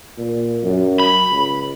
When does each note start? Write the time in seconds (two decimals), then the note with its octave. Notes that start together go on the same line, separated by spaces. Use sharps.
0.18 A#2
0.63 F#2
1.00 B5
1.31 C#2